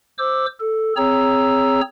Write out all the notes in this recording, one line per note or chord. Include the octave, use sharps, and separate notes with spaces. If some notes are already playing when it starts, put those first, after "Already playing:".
C5 D6 E6
A4
C4 G#4 C#5 A#5 E6